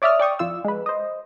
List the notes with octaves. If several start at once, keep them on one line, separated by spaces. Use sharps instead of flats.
C#5 D5 E5 D#6 F6
D5 G5 C#6 D#6
F2 F4 E6
G#3 B4
C5 D#5